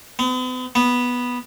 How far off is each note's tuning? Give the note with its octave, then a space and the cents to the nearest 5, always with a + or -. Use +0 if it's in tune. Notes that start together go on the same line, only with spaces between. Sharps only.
B3 +45
B3 -5